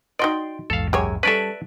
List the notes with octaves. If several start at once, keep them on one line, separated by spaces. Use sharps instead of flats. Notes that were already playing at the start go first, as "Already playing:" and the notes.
D#4 F#4 D5 D#5 G5 C6
A#1 E2 G#2 A4 F5
F#2 G4 G#4 C#5
G3 C#4 A4 B4 D5 E5 A5 C#6